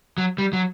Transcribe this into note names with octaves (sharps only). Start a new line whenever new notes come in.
F#3
G3
F#3